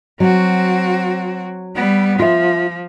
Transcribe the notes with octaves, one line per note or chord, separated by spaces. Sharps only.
F#3 C4 F#4
G3 B3
F3 F4 E5